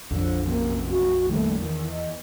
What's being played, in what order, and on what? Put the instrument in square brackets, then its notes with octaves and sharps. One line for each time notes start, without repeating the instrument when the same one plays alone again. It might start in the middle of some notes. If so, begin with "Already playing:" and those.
[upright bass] A#1 F2 [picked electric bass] D3 [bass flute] F3
[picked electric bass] F#2 C3 [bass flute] A#3
[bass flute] F#4
[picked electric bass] D#3 G3 A#3 [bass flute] A3
[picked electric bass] E2 [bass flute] D#3
[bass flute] D#5